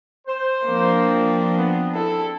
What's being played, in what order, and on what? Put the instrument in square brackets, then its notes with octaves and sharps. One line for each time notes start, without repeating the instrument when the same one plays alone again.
[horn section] C5
[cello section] F3 C4 D4 [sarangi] A#3
[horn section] B3
[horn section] E4 [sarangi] A4